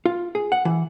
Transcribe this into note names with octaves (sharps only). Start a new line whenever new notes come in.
F4
G#4
F#5
E3